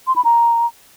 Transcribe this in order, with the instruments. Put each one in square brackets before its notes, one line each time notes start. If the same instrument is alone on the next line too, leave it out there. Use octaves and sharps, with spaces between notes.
[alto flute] C6
B5
A#5